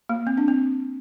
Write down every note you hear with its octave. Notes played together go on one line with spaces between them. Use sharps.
A#3
C4
D4
C4